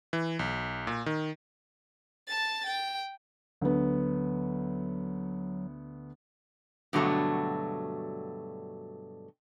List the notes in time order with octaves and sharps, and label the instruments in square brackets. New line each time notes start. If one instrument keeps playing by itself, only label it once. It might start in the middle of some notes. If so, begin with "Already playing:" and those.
[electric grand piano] E3
B1
A#2
D#3
[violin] A5 A6
G5
[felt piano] D2 B3 [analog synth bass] F#3
[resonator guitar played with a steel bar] G2 B2 D3 F#3 A3